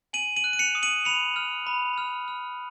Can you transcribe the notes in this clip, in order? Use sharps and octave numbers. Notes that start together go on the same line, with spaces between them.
G#5 D#7 F#7
D#7 F#7
F#6
D#7
C#7 F7
D#6
D#7 F#7
B5 C#7 F7
F6
B5
F6
F6